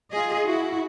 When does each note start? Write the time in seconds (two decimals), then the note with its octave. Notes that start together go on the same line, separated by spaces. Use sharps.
0.11 F4 G#4 D#5
0.47 E4 F#4